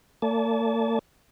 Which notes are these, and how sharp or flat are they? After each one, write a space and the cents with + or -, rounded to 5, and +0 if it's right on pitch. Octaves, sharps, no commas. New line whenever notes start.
A#3 -45 D5 -30 A5 -30